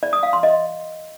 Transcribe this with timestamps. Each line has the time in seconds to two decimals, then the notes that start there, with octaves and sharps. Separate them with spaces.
0.03 D5
0.13 D#6
0.23 F5
0.33 C6
0.43 D#5